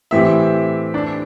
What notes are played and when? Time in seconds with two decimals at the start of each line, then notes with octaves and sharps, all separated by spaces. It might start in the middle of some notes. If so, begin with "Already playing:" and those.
0.11 A2 E3 C4 G4 E5
0.94 D4